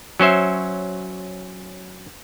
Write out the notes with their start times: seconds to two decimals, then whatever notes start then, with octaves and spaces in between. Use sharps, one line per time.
0.20 F#3 C#4 C5 E5